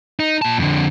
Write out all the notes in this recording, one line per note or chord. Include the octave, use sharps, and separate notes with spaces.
D#4
A#2 A5
F2 D3